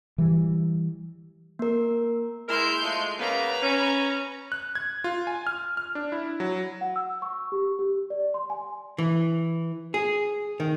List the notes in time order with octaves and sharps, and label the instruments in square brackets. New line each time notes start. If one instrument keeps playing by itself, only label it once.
[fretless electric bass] E3 G3
[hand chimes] A#3 A#4
[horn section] G#3 E4 A#4 [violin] C6 G6
[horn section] F3 G#3 A3
[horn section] C#3 A#3 B3 [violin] B4 A#5
[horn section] C#4
[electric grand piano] F#6
G#6
F4
G#5
F6
F6
D4
E4
F#3
[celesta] F#5
E6
C#6
G4
G4
D5
C6
G#5
[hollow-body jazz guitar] E3
G#4
D#3